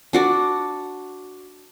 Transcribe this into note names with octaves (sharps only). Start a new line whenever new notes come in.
D4 F#4 D5